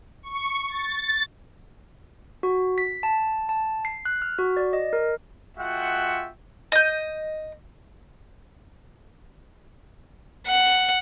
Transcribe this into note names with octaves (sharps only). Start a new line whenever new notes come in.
C#6
A6
F#4
B6
A5
A5
C7
F#6
F6
F#4
D5
D#5
A#4
G#3 F4 F#4 E5 F#5 G5
D#5 G6
F#5